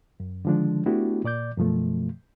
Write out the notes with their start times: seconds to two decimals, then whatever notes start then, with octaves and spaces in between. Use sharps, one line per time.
0.20 F#2
0.45 D3 D#3 F3 G#3 D4
0.86 A3 B3 D4 E4 F#4 G4
1.24 A#2 D5 D6 G6
1.58 F#2 B2 F3 A3